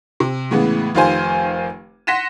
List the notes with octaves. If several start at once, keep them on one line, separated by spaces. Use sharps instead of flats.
C3
A2 C#3 E3 G#3 B3
F1 D#3 F4 G4 C5 G#5
F#5 C6 A#6 B6 D#7 E7